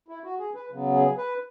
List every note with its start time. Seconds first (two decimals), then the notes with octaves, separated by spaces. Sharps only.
0.08 E4
0.24 F#4
0.39 G#4
0.55 B4
0.71 C#3 F#3 B3
0.94 G#4
1.18 B4